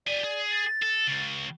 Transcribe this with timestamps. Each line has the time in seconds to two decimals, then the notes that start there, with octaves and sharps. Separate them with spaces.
0.07 G4 D5 G#5
0.24 G#4
0.51 A6
0.83 A4
1.07 C#2 C#3